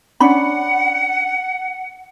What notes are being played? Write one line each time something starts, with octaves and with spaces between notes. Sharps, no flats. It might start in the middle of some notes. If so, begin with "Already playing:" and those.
C#4 D4 F#5 B5